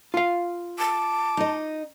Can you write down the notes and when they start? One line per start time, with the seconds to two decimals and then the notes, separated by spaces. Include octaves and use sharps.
0.14 F4 F5
0.79 A5 D6
1.37 D#4 D#5